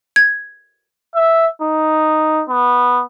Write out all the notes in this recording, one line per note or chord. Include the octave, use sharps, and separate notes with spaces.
G#6
E5
D#4
B3